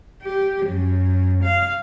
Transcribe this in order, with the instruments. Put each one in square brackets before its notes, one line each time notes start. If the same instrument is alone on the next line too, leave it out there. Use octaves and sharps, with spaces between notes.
[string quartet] G4
F#2
F5